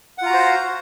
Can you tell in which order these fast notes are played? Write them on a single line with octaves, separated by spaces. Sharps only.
F#5 F4 A#5 F#4 C5